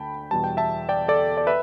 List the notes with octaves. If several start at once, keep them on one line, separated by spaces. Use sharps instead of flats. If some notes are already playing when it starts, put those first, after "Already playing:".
Already playing: D2 D3 G5 A5 B5
E2 B2 G3 A5
G5
E5 A5
D5 G5
A4 D5
D5
B4 E5